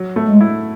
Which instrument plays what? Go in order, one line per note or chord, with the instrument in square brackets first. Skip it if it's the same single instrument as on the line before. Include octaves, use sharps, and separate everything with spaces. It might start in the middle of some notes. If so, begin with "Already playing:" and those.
Already playing: [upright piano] F#3
A3
[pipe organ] G#3
[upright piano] E4